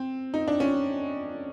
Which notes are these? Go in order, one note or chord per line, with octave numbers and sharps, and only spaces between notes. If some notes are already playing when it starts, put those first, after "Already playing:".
Already playing: C4
D#4
D4
C#4